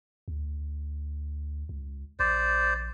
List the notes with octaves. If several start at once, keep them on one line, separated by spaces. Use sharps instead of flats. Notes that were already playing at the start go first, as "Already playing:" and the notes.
D2
C#2
A#1 C5 D5